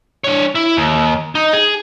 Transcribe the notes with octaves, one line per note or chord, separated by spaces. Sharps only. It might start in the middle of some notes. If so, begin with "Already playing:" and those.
D4 C#5
E4
D#2
D#4
G#4